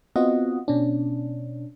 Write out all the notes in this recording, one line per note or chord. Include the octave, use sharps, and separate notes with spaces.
B3 C4 F4 F#4 D#5 F#5
B2 C#4 D4